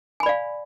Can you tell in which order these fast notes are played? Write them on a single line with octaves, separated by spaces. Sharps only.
G#5 B5 D5 F5